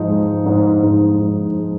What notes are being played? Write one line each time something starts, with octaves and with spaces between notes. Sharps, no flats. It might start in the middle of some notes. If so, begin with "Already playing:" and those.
Already playing: G#2 F3 D#4
G#3
G#2
G#2
G#2
G#3